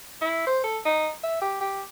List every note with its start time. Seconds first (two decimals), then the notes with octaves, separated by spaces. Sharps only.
0.22 E4
0.47 C5
0.64 A4
0.85 D#4
1.23 E5
1.42 G4
1.61 G4